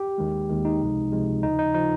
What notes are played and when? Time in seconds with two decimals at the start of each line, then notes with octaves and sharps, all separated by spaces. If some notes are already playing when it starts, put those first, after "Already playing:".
Already playing: G4
0.18 D#2 D#3 G#3
0.49 D#2 D#3 G#3
0.65 D#4
0.81 C#2 C3 F3 G#3
1.12 C#2 C3 F3 G#3
1.43 D#2 C#3 F3 D#4
1.59 D#4
1.75 C#3 F3 D#4